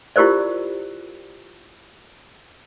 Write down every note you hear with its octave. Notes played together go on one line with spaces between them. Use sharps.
E4 F4 G4 A#4 C5 D5